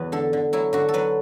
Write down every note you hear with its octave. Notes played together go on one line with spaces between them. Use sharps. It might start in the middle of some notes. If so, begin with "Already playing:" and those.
Already playing: E2 F#3 B3 B4
D3 A4
D3
F#3 E4
D3 F#4
A4
F#3 B4